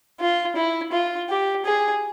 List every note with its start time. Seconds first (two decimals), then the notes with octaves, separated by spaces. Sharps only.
0.20 F4
0.56 E4
0.92 F4
1.29 G4
1.65 G#4